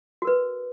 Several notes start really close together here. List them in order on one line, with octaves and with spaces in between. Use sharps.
F#4 A#4 B4